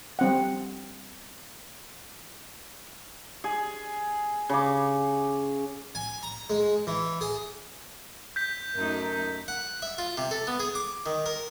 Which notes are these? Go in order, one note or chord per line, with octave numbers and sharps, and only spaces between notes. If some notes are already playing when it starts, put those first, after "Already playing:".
G3 C4 F#5
G#4
C#3 D6
G#5
A#5
G#3
E3
G#4
G6 B6
F#2 A3 D#4 A#4
F#5
E5
F4
C3
A4
B3
G#4
D6
D#3
A#4